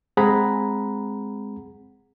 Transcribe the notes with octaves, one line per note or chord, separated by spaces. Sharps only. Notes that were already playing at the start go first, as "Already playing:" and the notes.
G#3 C4 G#4 F#5 A#5 B5